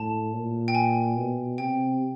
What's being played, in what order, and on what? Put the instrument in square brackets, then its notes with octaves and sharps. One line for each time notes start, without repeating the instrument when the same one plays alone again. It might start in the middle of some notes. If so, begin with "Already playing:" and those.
Already playing: [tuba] A2 [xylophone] A5
[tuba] A#2
[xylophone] G5
G#5
[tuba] B2
[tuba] C3 [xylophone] G5